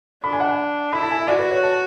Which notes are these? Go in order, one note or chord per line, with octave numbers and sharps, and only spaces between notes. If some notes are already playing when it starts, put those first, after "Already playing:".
D4 B5
G#5
F#5
E4 B5
A5
G#5
E5
F#4 D5
B4
C#5
A5